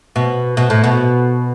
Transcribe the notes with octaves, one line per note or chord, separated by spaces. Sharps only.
B2
B2
A2
B2